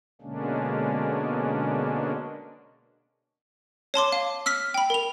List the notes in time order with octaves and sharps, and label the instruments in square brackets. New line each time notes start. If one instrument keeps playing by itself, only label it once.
[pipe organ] B2 D3 G#3 A#3 C#4 D4
[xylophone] C#5 A5 C6 D6
F5
E6 F6 B6
G5 B5
A#4 F7